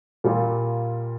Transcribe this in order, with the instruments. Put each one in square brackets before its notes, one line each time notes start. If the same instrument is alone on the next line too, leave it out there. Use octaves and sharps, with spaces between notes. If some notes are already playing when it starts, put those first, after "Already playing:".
[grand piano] A#2 G3 A#3 F4